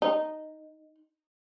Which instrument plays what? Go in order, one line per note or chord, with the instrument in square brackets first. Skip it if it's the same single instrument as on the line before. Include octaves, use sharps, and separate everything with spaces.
[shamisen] D#4